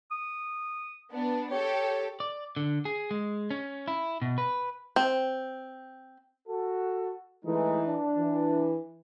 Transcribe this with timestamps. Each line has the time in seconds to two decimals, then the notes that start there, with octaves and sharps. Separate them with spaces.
0.11 D#6
1.11 B3 D4
1.51 G4 A4 C#5
2.20 D5
2.57 D3
2.85 G#4
3.11 G#3
3.51 C#4
3.88 E4
4.22 B2
4.38 B4
4.96 C4
6.48 F#4 A4
7.45 E3 G#3 A3 D#4
7.87 D4
8.17 E3